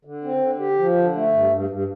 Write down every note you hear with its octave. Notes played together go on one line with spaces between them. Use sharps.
D3
C4
D3
G4
F3
D3
A3
G2
G2
G2